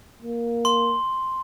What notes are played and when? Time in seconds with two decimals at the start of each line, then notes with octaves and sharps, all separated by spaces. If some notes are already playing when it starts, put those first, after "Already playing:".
0.22 A#3
0.65 C6